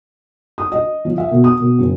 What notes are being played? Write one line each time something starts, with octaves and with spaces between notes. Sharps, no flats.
D#6
D#5
F3
E5
B2
D#6
B2
F#1